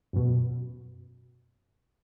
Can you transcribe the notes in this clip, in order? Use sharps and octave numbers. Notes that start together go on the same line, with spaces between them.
F#2 B2